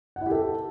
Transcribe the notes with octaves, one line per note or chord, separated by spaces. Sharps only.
F#5
E4
G4
A4